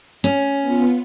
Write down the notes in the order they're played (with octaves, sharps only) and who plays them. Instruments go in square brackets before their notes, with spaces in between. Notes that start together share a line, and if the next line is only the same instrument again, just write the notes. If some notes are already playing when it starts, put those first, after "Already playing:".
[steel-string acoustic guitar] C#4
[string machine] B3 F4